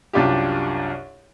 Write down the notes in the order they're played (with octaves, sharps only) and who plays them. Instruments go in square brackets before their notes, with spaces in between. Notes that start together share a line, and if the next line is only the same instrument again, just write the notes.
[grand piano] C2 F#2 D4 F4 G4